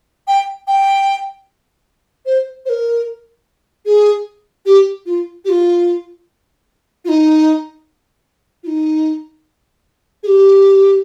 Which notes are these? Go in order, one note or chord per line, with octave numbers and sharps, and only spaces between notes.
G5
G5
C5
C5
A#4
G#4
G4
F4
G4
F4
F4
D#4
F4
D#4
G#4
G4